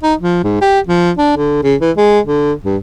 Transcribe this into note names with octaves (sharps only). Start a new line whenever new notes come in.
D#4
F3
G#2
G4
F3
D4
D3
C#3
E3
G#3
D3
G2